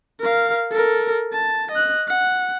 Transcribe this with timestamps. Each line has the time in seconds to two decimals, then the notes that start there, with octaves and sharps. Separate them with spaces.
0.20 A#4 F5
0.72 A4 A#4
1.32 A5
1.71 D#5 F#6
2.08 F#5